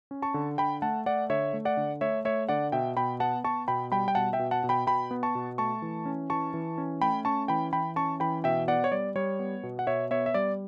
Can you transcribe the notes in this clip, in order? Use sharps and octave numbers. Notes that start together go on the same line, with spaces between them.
C#4
A5 C#6
D3
D3 G5 B5
A3 F#5 A5
A3 D5 F#5
D3 C#5 E5
A3
D5 F#5
D3
A3 C#5 E5
A3 C#5 E5
D3 D5 F#5
B2 E5 G5
B2 G5 B5
B3 F#5 A5
B3 A5 C#6
B2 G5 B5
G3 G5 B5
G5
B2 F#5 A5
E5 G5
B2
F#5 A5
B2
G5 B5
B2 G5 B5
B3
A5 C#6
B2
A3 A5 C#6
E3
C#4
E3 A5 C#6
E3
C#4
A3 G5 B5
C#4 A5 C#6
E3 G5 B5
E3 G5 B5
C#4 A5 C#6
E3 G5 B5
B2 E5 G5
B3 D5 F#5
C#5
G3 D5
G3 C#5
B3
B2
F#5
B2 C#5 E5
B3 C#5 E5
E5
G3 D5